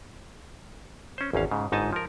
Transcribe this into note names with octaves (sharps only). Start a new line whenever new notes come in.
C#4 C5
G#1 E2 C#4 F5
G#2 C#3
G1 G#2 D#4 G#5 A5
F3 A#4